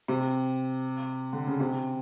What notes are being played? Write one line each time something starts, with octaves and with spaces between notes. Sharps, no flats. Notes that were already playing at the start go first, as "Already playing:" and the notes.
C3
D3
C#3
C3